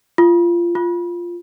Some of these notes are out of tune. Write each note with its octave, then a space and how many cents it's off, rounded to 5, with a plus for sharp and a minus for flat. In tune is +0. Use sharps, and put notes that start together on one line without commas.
F4 -20
F4 -5